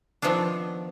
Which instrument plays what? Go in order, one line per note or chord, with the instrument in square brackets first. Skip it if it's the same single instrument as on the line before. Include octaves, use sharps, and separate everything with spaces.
[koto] D#3 F3 B3 C4 D4